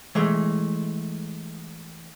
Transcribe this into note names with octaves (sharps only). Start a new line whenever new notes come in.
E3 G#3 A3